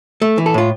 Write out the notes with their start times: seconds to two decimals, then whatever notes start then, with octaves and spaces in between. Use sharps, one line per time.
0.22 A3
0.38 E3
0.46 A4
0.54 A2 F4